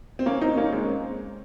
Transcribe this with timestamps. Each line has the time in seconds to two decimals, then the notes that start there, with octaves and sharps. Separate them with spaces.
0.19 C4
0.26 A#3 C#4
0.41 C4 D#4
0.57 A#3 C#4
0.73 G#3 C4